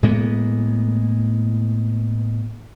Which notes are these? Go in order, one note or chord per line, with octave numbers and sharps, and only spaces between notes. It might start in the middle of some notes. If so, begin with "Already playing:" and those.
A2 G#3 A#3 B3